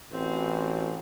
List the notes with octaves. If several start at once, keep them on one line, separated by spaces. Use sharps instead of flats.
A1 C4 F#4